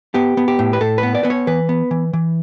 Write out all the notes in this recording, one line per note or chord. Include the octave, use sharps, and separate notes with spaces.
B3 G4
B3
G4
A2
B4
A2 A4
B4
B3
D5
B3 B4
C#5
E3 B4
B3
E3
E3